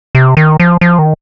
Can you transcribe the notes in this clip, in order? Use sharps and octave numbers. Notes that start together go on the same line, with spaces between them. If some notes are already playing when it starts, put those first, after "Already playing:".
C3
D#3
F3
F3
D#3